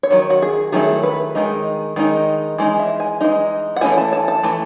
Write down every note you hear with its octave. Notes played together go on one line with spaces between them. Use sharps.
C#5
D#3 F#3
F#4
G#4
D#3 F#3 A3 E4 G#4
B4
D#3 G#3 D#4
D#3 G#3 D#4
E3 G#3 D#4
E5
G#5
E3 G#3 D#4
F#5
E3 A3 C#4 E4 G#5
A5
A5
A5
E3 A3